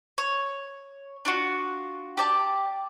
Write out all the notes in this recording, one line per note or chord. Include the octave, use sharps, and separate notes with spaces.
C#5
D4 F4 F#4
G4 D5 A5